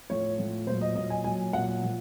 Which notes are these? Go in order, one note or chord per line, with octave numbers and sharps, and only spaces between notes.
A2 F3 C#5
A2 F3
A#2 F#3 C5
D#5
A#2 F#3 D#5
G#5
A#2 F#3 G#5
A#2 F#3 F#5
A#2 F3